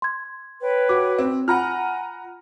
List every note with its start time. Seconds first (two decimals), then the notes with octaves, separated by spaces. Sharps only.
0.02 C6 G#6
0.61 B4 C#5 G5
0.89 F#4 D6
1.19 C4
1.48 F4 F#5 G#5 A#5 B5 F6